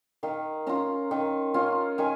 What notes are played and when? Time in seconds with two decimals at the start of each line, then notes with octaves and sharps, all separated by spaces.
0.23 D#3 F5
0.67 C#4 F4 A#5
1.11 D#3
1.54 C#4 F4
1.98 D#3 G#5